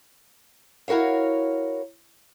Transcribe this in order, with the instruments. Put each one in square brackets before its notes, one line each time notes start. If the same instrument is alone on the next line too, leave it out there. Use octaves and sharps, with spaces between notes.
[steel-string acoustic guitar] E4 F#4 A#4 C#5 F5